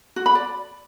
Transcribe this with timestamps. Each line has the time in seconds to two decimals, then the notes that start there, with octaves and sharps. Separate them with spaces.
0.16 F#4
0.26 B5
0.35 D5